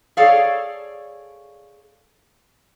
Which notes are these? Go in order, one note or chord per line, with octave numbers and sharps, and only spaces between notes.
G#4 A4 C#5 D5 F5